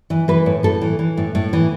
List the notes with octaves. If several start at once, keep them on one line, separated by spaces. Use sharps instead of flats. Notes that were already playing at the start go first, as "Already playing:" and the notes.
E3
E3 B4
A2
A2 A4
E3
E3
A2
A2
E3